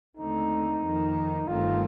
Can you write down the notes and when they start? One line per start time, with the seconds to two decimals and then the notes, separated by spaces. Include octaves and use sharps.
0.17 D#2 D3 A3 C4 D#4
0.83 F2 D#3 A#3
1.47 G1 G2 D#3 A3 C4 F4